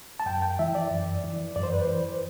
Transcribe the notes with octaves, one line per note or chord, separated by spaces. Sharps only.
A5
F#2 G5
G5
E3 E5
D5
F#2
E3
F#2 D5
C5
B4
C5
E3